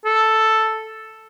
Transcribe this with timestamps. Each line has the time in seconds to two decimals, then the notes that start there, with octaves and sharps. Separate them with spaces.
0.05 A4